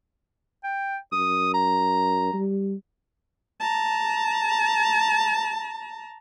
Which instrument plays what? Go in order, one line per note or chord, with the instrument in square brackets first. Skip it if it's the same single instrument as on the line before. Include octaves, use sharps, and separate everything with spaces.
[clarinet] G5
[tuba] F#2 [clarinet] D#6
[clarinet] A#5
[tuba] G3
[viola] A5 A#5